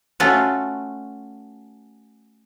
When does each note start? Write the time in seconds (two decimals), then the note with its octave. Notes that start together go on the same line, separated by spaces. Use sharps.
0.20 A3 C#4 F4 F#4